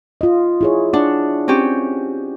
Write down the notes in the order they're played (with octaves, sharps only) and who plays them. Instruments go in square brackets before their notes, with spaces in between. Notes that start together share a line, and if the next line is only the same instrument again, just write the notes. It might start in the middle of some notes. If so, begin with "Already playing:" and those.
[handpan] F4 D#5
E4 G#4 C#5
[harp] D4 [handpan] F#5
[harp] C4 C#4 G4